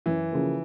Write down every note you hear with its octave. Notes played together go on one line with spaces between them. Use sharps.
F#2 E3
C#3 F3 A#3